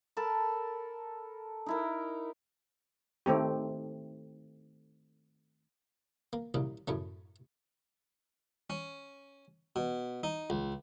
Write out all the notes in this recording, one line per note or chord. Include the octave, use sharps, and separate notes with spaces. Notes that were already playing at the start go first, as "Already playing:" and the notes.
A4 A#4 A5 B5
D#4 E4 A#4
D#3 A3 C4 G4
A#3
C2 A#2 C#3
F#2 A2 C#3 A3
C#4
B2
D#4
C#2